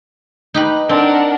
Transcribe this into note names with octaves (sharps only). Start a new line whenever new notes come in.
D#4 G4 B4
C4 D4 A#4 F#5